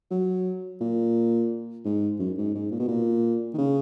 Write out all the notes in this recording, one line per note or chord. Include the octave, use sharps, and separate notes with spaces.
F#3
A#2
G#2
F#2
G#2
G#2
A#2
B2
A#2
D#3
C#3